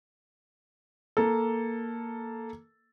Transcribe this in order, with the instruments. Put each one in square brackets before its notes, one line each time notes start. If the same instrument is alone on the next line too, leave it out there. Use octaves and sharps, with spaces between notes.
[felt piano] A#3 A4